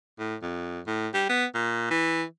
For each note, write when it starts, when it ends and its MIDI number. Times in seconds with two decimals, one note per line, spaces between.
0.19 0.35 45
0.42 0.80 41
0.87 1.08 45
1.14 1.28 55
1.29 1.45 59
1.55 1.86 46
1.91 2.24 52